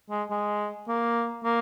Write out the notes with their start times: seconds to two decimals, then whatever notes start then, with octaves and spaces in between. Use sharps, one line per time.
0.10 G#3
0.30 G#3
0.88 A#3
1.44 A#3